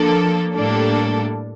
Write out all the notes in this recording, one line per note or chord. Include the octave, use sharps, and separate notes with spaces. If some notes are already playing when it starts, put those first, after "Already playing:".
Already playing: F3 A#3 D4 A4
A2 G3 A#3 D4 A4